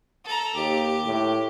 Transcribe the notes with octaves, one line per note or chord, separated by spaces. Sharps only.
A4 A#5
D#2 G4
A2